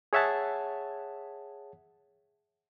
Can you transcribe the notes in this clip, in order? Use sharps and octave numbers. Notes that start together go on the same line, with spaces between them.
G#4 C#5 E5 F#5 A5